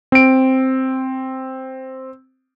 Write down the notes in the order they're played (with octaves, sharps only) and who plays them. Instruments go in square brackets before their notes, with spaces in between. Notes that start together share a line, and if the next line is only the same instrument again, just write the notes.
[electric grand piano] C4 D7